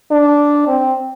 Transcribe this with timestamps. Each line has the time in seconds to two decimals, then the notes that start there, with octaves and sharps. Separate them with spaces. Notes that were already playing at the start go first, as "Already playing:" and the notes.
0.11 D4
0.68 C4